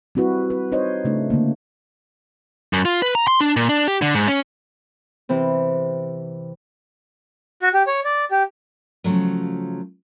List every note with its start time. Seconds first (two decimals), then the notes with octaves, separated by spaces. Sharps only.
0.15 G3 C4 E4 F#4 B4
0.50 B4
0.72 D#4 C5 C#5 D#5
1.05 C#3 A3 D4
1.30 D3 A3 A#3
2.73 F#2
2.85 F4
3.02 B4
3.15 A#5
3.27 C6
3.41 D4
3.56 A#2
3.69 D4
3.88 G4
4.02 D3
4.15 G#2
4.28 C#4
5.29 C3 E3 C4
7.61 F#4
7.74 G4
7.87 C#5
8.04 D5
8.31 G4
9.04 C#3 F3 F#3 A3